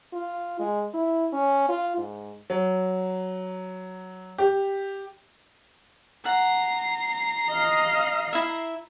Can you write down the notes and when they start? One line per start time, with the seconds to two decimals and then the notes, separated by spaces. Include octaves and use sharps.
0.13 F4
0.60 G#3
0.94 E4
1.33 C#4
1.69 F4
1.97 G#2
2.50 F#3
4.38 G4
6.25 F#5 A#5 C7
7.49 D#5 F5
8.33 E4 E5